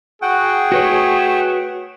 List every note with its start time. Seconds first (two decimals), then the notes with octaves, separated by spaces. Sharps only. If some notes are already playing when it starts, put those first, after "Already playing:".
0.22 F#4 G#4 F#5 G5
0.72 A3 F#4 B4 C#5